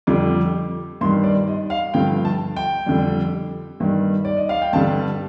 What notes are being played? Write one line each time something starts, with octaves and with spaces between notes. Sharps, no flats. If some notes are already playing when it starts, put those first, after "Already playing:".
F2 D3 G3 D6
G2 D#3 G3 C6
D5
D#5
F5
G2 D3 F3 G5
A5
G5
F2 D3 G3
G2 D#3 G3
D5
D#5
F5
G5
G2 D3 G3 A5